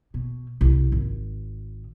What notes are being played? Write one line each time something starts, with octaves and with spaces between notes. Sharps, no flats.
B2
C2
G#1